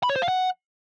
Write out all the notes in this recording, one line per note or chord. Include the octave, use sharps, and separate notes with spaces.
B5
C#5
C5
F5
F#5